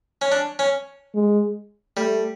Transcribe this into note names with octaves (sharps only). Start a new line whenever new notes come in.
C#4
D4
C#4
G#3
G3 A3